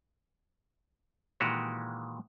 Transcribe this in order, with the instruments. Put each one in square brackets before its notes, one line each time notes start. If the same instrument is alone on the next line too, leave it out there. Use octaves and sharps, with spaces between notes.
[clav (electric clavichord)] A#2 D#3 E3 G#3 F#4 G4